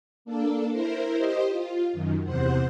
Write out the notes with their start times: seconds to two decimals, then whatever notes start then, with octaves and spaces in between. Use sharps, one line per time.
0.25 A#3 D4 A4
0.70 E4 A#4 C5
1.18 G4 C5 D#5
1.50 F4
1.93 F#2 D#3
2.24 E2 C3 C5 F#5